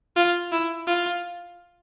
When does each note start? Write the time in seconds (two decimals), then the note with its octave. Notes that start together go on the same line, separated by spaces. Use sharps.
0.16 F4
0.52 E4
0.87 F4